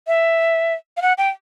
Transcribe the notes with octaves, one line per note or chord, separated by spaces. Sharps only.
E5
F5
F#5
G5